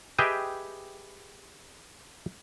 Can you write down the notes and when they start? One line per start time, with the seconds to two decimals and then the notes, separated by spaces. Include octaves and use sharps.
0.18 G4 G#4 B4 D#5 E5 G5